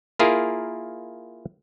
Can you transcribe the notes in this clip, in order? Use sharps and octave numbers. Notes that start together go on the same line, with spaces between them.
A#3 E4 F4 G#4 A#4